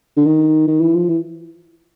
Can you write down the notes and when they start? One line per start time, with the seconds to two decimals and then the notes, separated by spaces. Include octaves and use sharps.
0.17 D3
0.26 D#3
0.67 D#3
0.80 E3
0.95 F3
1.09 E3